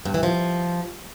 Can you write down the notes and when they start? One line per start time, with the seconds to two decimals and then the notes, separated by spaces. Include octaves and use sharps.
0.05 G2
0.14 E3
0.23 F3